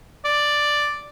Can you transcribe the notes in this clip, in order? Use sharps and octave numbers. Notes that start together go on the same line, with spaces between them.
D5